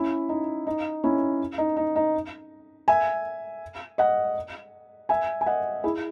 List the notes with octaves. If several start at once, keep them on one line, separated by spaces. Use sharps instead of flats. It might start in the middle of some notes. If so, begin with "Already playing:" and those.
Already playing: C#4 E4
D#4
D#4
C#4 E4
D#4
D#4
D#4
E5 G#5
D#5 F#5
E5 G#5
G#5
D#5 F#5
E4 G#4